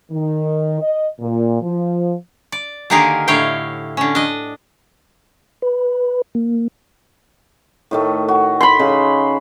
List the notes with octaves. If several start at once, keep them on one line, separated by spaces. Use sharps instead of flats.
D#3
D#5
A#2
F3
D5
D3 D#3 A#3 G4 G#4 A#4
A2 D3 E4 C#5 F5 G5
D3 C#4
D4 D#5
B4
A#3
A2 D#3 A3
F#4
B5 C6
C#3 D#4 G#4